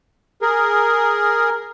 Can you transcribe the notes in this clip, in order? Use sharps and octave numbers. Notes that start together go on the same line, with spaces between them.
G#4 A#4